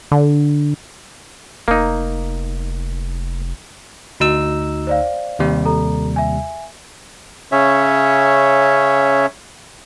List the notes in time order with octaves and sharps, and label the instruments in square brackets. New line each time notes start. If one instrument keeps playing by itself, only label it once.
[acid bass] D3
[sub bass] F1 [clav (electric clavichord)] A#3 D#4
[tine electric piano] D2 D#4 E6 [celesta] F#4
[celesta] C5 D5 F5
[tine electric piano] D#2 C3 G3
[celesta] A4 A#5
E5 G#5
[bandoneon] C#3 C#4 C#5 E5